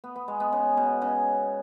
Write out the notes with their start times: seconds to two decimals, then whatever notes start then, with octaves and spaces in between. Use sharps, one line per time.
0.04 B3
0.16 B3
0.28 G#3
0.40 B3
0.53 C#3
0.77 B2
1.02 C#3